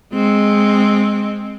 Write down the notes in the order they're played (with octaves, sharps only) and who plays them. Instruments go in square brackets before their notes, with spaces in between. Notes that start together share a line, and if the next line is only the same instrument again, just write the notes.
[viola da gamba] G#3 C4